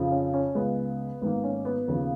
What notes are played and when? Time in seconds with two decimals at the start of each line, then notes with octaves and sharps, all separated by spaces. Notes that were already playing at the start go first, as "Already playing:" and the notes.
Already playing: F2 C#3 F3
0.11 C#4
0.34 C#4
0.55 C#2 C#3 G#3 B3
1.21 G#1 G#2 D#3 A#3 B3
1.44 C#4
1.65 B3
1.88 D#2 C#3 F3 A#3